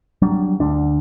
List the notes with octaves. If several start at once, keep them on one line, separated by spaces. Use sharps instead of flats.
F#3 G3 D4
D2 D3 D4